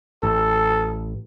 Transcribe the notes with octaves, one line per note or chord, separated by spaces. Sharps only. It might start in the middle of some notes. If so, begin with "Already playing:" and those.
A1 A4